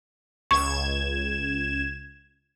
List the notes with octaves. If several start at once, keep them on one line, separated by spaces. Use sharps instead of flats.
C#2 C#6 G#6 E7